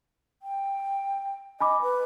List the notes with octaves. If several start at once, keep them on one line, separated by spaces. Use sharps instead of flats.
G5
D#5 G#5 B5 D6
B4